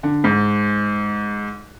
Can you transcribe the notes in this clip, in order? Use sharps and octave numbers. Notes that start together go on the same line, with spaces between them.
D3
G#2